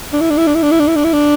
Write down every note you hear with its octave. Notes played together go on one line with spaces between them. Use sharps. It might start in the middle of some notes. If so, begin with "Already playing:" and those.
D4
E4
D4
E4
D4
E4
D4
E4
D4
E4
D4
E4
D4